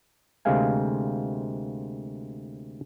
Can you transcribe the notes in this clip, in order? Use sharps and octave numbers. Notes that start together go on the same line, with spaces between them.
D2 C3 G#3 A#3 F5 G#5